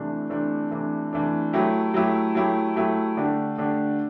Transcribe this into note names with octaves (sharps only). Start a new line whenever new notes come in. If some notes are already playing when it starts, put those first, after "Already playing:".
Already playing: C3 E3 A3 D4
C3 E3 A3 D4
C3 E3 A3 D4
C3 E3 A3 D4
F#3 A3 E4 G4
F#3 A3 E4 G4
F#3 A3 E4 G4
F#3 A3 E4 G4
D3 A3 D4 G4
D3 A3 D4 G4